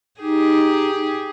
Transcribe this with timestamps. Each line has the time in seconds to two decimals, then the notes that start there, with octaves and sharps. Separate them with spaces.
0.21 D#4 G4 G#4